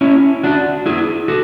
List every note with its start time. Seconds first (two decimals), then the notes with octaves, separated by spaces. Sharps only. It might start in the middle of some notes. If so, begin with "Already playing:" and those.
0.01 C#4 E4
0.43 D4 F#4
0.86 E4 G#4
1.28 F#4 A4